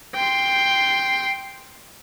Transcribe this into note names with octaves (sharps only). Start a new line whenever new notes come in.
G5 C6